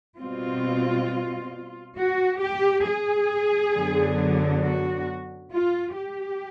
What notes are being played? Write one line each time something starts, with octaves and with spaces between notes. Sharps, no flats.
B2 G3 C4 F4
F#4
G4
G#4
F#2 D3 F#3 B3 D4
F#4
F4
G4